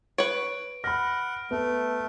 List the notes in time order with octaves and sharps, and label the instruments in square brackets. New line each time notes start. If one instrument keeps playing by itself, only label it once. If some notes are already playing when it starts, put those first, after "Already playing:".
[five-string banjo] B4 C#5 [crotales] D7
[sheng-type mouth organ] F#5 [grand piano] B5 A#6 [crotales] F6
[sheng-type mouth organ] A3 [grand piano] B3